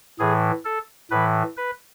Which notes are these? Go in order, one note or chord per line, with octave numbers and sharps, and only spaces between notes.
A2 E3 G#4
A4
A2 E3 B4
B4